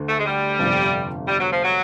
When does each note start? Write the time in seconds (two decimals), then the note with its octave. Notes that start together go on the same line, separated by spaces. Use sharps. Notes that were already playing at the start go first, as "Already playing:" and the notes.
Already playing: D2 D3
0.08 A3
0.18 G#3
0.25 G3
0.59 G1 F2 C3
1.27 G3
1.40 F#3
1.52 F3
1.64 F#3